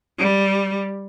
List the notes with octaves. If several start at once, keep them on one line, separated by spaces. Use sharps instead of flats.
G3